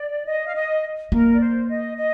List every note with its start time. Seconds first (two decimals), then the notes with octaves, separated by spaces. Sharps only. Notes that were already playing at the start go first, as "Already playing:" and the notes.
Already playing: D5
0.26 D#5
0.46 F5
0.55 D#5
1.12 A#3 A#4
1.34 D5
1.40 C5
1.69 D#5
1.97 D#5